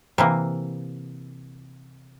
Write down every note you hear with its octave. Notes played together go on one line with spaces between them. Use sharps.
C3 E3 A#3